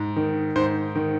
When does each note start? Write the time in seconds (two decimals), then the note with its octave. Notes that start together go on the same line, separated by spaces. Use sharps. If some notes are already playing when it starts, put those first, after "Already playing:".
Already playing: G#2
0.16 D#3
0.56 G#2 C5
0.95 D#3